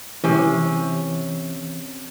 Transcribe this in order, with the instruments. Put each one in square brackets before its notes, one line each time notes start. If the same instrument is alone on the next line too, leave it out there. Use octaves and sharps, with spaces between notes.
[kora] C3 C#4 [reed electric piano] E3